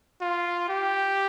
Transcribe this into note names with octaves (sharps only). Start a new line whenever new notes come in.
F4
G4